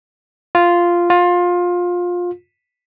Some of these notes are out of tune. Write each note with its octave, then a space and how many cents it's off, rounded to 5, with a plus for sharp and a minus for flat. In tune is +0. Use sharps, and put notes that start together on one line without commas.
F4 -5
F4 +20